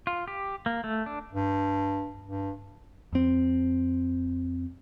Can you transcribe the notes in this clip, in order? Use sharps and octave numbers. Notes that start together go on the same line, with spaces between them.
F4
G4
A#3
A3
D4
G2
G2
F2 C4